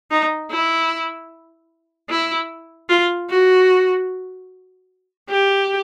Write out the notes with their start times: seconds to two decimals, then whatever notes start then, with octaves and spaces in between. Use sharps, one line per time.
0.11 D#4
0.51 E4
2.10 E4
2.89 F4
3.29 F#4
5.29 G4